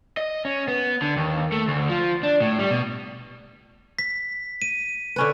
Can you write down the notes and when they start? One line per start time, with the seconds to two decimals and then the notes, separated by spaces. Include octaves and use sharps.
0.17 D#5
0.45 C#4
0.68 B3
1.02 D3
1.17 D#2
1.52 A3
1.68 D2
1.90 F3
2.23 D4
2.41 A2
2.59 G3
2.71 B2
3.99 B6
4.62 D#7
5.16 D3 C#4 B4